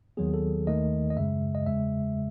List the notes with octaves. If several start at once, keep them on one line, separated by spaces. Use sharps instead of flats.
D#2 D#3 F#3 B3 G#4
A4
D#2 D#3 A3 D#5
D#5
F#2 C#3 G#3 E5
D#5
E2 C#3 G#3 E5